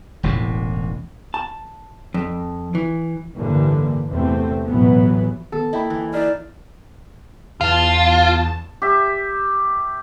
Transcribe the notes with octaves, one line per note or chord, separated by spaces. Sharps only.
E1 A1 A2 C3
A5
F2
E3
A1 G2 D3 E3 G3 A#3
E2 C3 A3 C4
A1 G#2 B2 E3 F#3 B3
D#3 B3 A4
A#3 E4 D#5 G5 B5
E3
D#4 E4 D5 E5 F6
E2 F4 A5
G4 E5